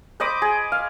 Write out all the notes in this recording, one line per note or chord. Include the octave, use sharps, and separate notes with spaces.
C5 D#5 B5 D6
G#4
F5